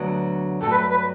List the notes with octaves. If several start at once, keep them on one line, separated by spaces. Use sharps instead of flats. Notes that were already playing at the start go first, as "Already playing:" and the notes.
Already playing: D2 D3 F#3 B3
G2 F#3 A3 A4
B4
B4